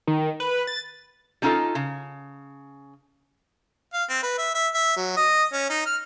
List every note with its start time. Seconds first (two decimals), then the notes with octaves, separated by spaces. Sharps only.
0.07 D#3
0.40 B4
0.67 A6
1.42 G3 C#4 D#4 F4 A4 D#5
1.75 C#3
3.93 F5
4.10 C4
4.23 B4
4.38 E5
4.55 E5
4.75 E5
4.96 F#3
5.17 D#5
5.53 C#4
5.70 D#4
5.86 F6